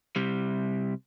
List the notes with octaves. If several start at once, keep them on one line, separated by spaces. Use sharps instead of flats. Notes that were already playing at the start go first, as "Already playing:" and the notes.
C3 G3